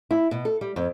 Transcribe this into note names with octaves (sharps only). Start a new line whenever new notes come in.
E4
B2
A4
G3
F2